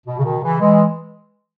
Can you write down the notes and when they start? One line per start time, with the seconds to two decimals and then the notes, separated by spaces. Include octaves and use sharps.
0.06 B2
0.18 C#3
0.23 B2 D#3
0.41 C#3 E3
0.60 E3 G#3